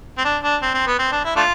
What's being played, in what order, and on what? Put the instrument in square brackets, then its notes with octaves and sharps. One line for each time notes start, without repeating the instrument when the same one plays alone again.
[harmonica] C4
D4
D4
C4
C4
B3
C4
D4
E4
A3 D4 F4